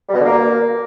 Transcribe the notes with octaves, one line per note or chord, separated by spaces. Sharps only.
G3
B2
D3
A#3